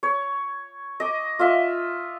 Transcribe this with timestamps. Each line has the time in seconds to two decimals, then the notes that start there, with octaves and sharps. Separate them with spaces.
0.03 C#5
1.00 D#5 D6
1.39 F4 D#5 E5